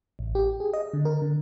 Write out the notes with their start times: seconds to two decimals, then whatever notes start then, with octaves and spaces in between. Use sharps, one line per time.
0.19 A1
0.35 G4
0.60 G#4
0.73 D#5
0.93 D3
1.05 A#4
1.22 D3